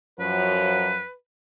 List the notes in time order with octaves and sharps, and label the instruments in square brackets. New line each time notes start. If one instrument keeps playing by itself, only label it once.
[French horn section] F#2 F3 F#3 [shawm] B4